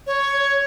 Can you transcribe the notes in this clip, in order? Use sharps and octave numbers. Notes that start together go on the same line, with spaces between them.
C#5